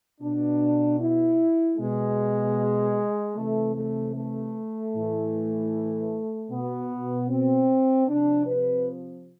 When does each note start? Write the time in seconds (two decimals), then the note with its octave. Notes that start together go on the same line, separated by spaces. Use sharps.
0.21 B2 D4
0.99 E4
1.78 B2 G#3
3.35 C3 E3 A3
3.75 A3
4.14 A3
4.93 A2 E3
6.50 B2 B3
7.29 C4
8.08 C3 F3 D4
8.47 B4